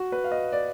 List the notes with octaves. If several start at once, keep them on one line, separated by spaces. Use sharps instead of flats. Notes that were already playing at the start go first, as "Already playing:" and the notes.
Already playing: F#4
B4
F5
D#5
D5